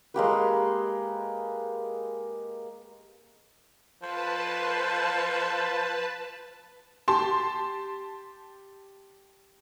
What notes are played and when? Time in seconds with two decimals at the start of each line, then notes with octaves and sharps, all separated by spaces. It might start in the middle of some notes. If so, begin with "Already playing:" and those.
0.14 G#3 A#3 G4 B4
4.02 F3 B4 A5
7.08 G4 A5 C6